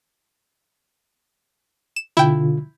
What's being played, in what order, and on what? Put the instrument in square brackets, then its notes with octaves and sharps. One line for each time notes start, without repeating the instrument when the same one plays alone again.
[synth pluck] E7
[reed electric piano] B2 D3 F4 [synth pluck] E4 G5